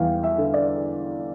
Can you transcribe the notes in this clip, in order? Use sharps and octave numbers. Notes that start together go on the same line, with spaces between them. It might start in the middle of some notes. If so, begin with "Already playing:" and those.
Already playing: E2 G3 F5 G5
E5
D3
D5